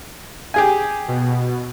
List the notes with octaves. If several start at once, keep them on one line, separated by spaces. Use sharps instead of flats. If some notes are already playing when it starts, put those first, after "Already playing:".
G4 G#4 G#5
B2